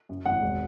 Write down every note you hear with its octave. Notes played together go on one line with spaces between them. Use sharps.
F#2
G#1 F#5
E1